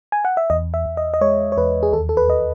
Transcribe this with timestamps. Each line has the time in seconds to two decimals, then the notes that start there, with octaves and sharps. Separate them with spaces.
0.12 G#5
0.25 F#5
0.37 E5
0.50 E2 D#5
0.74 E5
0.86 E2
0.97 D#5
1.14 D#5
1.21 G#3 C#5
1.52 C#5
1.57 E2 B4
1.83 G#4
1.93 D#2 A4
2.09 A4
2.17 B4
2.29 D#2 D#5